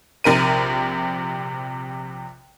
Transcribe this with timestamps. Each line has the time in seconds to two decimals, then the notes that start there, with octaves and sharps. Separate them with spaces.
0.24 A#1 C3 A#4 D#7